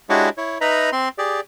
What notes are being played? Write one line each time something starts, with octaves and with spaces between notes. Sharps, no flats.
G#3 D4 E4 F#4 G4 C#5
E4 C#5
D#4 B4 D#5 E5 A#5 B5
C4 C6
G4 G#4 D5